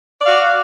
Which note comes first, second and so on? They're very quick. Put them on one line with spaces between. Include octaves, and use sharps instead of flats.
D5 F5 F#4